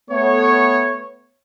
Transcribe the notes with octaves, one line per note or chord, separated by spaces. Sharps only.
A3 B3 C#5